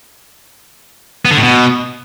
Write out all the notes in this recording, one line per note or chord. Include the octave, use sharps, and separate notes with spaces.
B3
D3
A2
B2